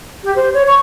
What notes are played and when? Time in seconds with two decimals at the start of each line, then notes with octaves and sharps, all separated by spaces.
0.24 G4
0.36 C5
0.54 C#5
0.67 C#6